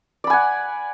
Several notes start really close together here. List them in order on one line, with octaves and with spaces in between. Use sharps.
D5 B5 G#5 F#5